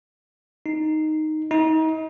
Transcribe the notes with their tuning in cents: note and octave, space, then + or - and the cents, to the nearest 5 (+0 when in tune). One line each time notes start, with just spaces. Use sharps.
D#4 -5
D#4 +30